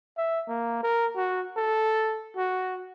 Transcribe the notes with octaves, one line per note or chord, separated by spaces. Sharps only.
E5
A#3
A#4
F#4
A4
F#4